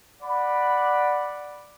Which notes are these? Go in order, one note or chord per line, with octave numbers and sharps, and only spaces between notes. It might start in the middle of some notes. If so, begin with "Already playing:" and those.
D5 F#5 B5